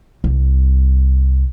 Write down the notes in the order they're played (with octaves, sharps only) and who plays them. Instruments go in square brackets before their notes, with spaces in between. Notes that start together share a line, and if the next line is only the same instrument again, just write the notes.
[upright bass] C2